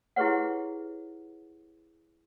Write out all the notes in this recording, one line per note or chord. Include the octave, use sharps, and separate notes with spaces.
E4 G4 G#4 B4 C#5 F#5